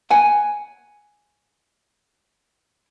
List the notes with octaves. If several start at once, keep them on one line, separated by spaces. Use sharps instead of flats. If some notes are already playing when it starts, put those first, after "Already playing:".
F#5 G#5